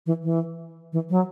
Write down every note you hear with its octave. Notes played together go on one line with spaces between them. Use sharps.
E3
E3
E3
F#3